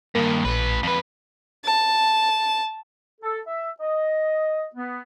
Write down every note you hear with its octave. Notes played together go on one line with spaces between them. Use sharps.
G2 D#3 A#3
A#1 A2 B4
F2 B4
A5
A4
E5
D#5
B3